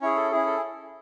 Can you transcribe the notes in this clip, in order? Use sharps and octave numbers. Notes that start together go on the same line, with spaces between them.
C#4 E4 G#4 C#5
A4
C#4 E4 G#4
A4